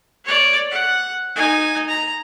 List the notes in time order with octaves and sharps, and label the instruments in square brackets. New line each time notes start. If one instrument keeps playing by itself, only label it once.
[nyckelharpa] C#5 D5
F#5
D#4 G#5
A#5